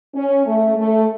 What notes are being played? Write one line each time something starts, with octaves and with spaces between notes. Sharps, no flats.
C#4
A3
A3